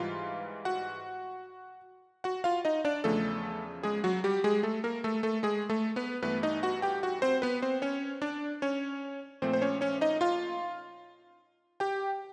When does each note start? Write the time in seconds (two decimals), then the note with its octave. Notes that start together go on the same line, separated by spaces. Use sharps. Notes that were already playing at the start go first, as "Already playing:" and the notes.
Already playing: G#2 E3 G3 F4 F5
0.65 F#4 F#5
2.24 F#4 F#5
2.44 F4 F5
2.65 D#4 D#5
2.85 D4 D5
3.04 E2 C#3 F3 A3 A4
3.83 G#3 G#4
4.04 F#3 F#4
4.24 G3 G4
4.44 G#3 G#4
4.63 A3 A4
4.84 A#3 A#4
5.04 A3 A4
5.23 A3 A4
5.43 G#3 G#4
5.70 A3 A4
5.96 B3 B4
6.22 G2 E3 A3 B3 B4
6.43 D#4 D#5
6.63 F#4 F#5
6.82 G4 G5
7.03 F#4 F#5
7.22 C4 C5
7.42 B3 B4
7.62 C4 C5
7.82 C#4 C#5
8.22 D4 D5
8.62 C#4 C#5
9.42 A#2 F3 A3 C4 C5
9.53 C5
9.62 C#4 C#5
9.81 C#4 C#5
10.01 D#4 D#5
10.21 F4 F5
11.80 G4 G5